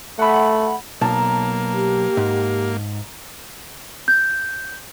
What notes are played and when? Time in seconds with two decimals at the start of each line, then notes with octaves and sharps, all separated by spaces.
0.19 A3 F#5 B5
1.01 B1 A#3 A5 A#5
1.73 G4
2.17 G#2
4.08 G6